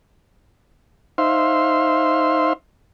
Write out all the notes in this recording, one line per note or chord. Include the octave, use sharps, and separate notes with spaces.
D#4 C5 E5 F5 C6